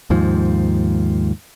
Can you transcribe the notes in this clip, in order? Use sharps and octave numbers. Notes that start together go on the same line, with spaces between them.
D#2 G#2 F3